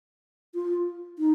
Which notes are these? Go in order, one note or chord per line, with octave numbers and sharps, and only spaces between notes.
F4
D#4